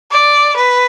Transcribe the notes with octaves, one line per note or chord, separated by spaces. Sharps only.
D5
B4